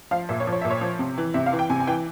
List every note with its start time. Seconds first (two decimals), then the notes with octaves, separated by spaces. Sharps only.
0.11 F3 F5
0.29 A#2 E5
0.40 C#5
0.47 F3
0.52 C#5
0.61 A#2 E5
0.71 C#5
0.81 F3
0.99 C3
1.18 E3
1.34 C3 E5
1.46 F5
1.53 E3
1.59 G5
1.69 C3 G#5
1.80 G#5
1.87 E3 G5